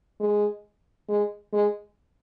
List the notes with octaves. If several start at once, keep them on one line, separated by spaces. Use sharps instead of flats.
G#3
G#3
G#3